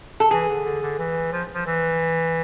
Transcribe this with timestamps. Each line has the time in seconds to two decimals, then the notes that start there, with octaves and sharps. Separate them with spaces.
0.20 A4
0.30 E3 G#4
0.48 D3
0.65 D3
0.82 D3
0.99 E3
1.32 F3
1.53 F3
1.66 E3